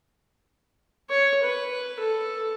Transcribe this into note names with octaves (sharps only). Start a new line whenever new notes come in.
C#5
B4
A4